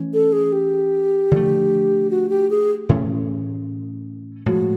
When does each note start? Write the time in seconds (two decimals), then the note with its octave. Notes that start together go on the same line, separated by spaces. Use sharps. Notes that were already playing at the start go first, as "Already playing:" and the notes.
Already playing: E3 A3 C#4
0.13 A4
0.32 G#4
0.52 G4
1.31 D3 F3 A3
2.10 F#4
2.29 G4
2.50 G#4
2.89 A2 E3 A3 C#4
4.46 A2 F3 G#3 F#4